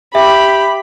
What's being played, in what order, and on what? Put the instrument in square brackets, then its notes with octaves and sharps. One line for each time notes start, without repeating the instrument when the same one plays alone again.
[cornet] G4 [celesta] E5 [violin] B5